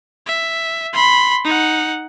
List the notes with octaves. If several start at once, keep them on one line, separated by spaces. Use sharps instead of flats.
E5
B5 C6
D#4 F#5